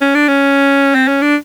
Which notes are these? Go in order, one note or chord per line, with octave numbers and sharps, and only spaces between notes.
C#4
D4
C#4
C4
C#4
D4